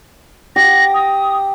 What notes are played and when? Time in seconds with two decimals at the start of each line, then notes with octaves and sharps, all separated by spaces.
0.56 G4 A#6
0.94 D#6